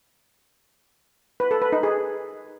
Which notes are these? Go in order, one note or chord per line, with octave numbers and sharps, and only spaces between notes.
B4
A4
B4
D#4
G#4